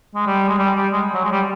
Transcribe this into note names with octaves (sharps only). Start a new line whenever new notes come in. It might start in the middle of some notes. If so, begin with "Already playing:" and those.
G#3
G3
G#3
G3
G3
G#3
F#3
G#3
G3